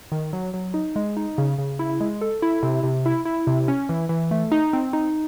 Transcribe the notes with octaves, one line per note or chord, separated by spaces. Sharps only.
D#3
F#3
F#3
D#4
G#3
D#4
C#3
C#3
E4
G#3
A4
E4
C3
C3
E4
E4
C3
C#4
E3
E3
A3
D#4
C4
D#4